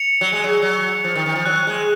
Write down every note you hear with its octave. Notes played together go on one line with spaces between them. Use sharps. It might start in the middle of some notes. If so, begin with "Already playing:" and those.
Already playing: C#7 F7
F#3
G#3
F#3
F#3
F3
D#3
D#3
F3
F#3 F#6
G#3